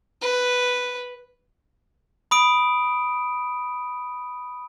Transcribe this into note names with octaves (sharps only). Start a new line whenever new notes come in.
B4
B5 D#6 D7